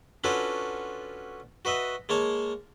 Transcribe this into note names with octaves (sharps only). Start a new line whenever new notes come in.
C#4 D4 F4 F#4 A4 B4
F#4 B4 D#5 E5
G#3 A#3 C#5 A5